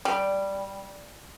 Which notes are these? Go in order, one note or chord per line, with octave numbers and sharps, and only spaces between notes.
G3